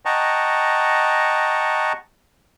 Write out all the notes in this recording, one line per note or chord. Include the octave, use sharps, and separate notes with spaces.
D#5 F#5 G5 A5 A#5 C#6